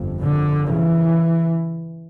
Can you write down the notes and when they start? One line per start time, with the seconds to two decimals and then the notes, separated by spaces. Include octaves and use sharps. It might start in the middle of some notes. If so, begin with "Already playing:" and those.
Already playing: G1 F2
0.22 D3
0.66 C#3 E3